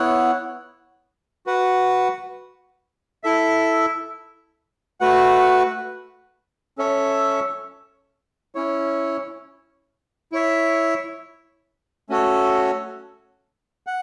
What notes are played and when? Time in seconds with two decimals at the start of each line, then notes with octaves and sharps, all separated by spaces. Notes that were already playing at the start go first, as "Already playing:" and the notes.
Already playing: B3 E4 C#5 F#5
1.46 F#4 B4 F#5
3.24 E4 A4 E5
5.00 A3 F#4 B4 F#5
6.78 C#4 A4 C#5 E5
8.55 C#4 E4 C#5
10.32 E4 C#5 E5
12.09 A3 C#4 F#4 A4 C#5
13.87 F#5